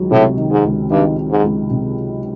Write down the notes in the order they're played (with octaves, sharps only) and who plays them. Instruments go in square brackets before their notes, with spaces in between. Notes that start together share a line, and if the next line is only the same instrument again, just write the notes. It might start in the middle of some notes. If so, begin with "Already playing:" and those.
Already playing: [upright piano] C#2 D#3 F#3
[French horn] A2 [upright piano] C3
[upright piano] D#3
[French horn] G#2
[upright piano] C#2
[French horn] G2 [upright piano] D#3
[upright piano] D#3
[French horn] G#2
[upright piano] C#2
C3